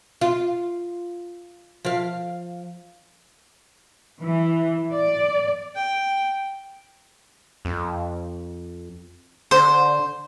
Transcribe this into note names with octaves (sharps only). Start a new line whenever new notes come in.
F4
F3 F5
E3
D5
G5
F2
D3 C5